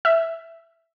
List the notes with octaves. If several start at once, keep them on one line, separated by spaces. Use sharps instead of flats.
E5